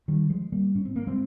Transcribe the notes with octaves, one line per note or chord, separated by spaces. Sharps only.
D#3 G3
F3 G#3
G3 A#3
G#2 C#4
C4
A#3
G#3 C4